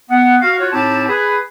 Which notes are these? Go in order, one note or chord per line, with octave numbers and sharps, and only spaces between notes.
B3 F#5
F#4 F5
F4 F#4 C#5
A2 C4 D#4 G4 A5
G#4 B4